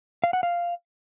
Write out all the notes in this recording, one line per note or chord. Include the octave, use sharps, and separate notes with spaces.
F5
F#5
F5